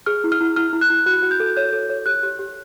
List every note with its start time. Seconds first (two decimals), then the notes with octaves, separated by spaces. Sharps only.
0.06 G#4 F6
0.24 E4
0.32 F6
0.41 E4
0.56 E4 F6
0.73 E4
0.81 F#6
0.90 E4
1.06 F#4 F#6
1.23 F#4
1.31 G6
1.40 A4
1.56 C#5 G6
1.72 A4
1.90 C#5
2.06 G4 F#6
2.23 G4
2.39 G4